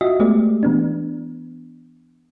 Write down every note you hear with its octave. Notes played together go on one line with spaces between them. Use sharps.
F4 F#4 D#5 E5
G#3 A3 B3 G4 D5
E3 B3 D4